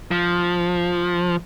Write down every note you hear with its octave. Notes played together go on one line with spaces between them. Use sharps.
F3